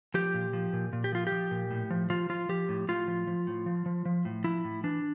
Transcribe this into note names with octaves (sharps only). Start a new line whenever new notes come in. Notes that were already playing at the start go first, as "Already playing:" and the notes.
F3 G4
A#2
F3
A#2
A#2
G4
F3 F4
G4
F3
A#2
A2
F3
F3 F4
F3 F4
F3 G4
A2
A2 F4
F3
F3
A2
F3
F3
F3
A2
F3 E4
A2
E3 D4